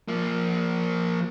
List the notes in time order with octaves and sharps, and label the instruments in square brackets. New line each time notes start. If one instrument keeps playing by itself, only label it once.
[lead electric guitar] F3 A#3